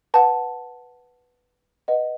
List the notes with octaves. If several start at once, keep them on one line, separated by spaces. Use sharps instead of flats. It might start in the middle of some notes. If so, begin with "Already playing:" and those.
B4 F#5 A5
B4 D#5 F#5